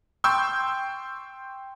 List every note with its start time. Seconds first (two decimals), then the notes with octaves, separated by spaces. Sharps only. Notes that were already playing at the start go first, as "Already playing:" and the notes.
0.24 G5 C6 C#6 E6 G6